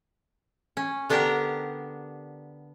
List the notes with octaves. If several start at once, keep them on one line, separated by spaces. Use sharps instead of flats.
C#4
D3 B3 D4 G4 A#4 A#5